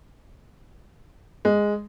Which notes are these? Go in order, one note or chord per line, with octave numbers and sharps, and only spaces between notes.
G#3